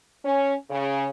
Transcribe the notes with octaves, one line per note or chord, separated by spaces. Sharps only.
C#4
C#3